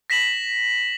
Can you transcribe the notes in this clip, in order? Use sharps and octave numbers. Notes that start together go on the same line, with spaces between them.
A#6 B6 E7 F#7